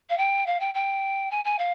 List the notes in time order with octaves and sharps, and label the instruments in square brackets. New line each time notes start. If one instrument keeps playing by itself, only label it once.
[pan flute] F5
G5
F5
G5
G5
G#5
G#5
F5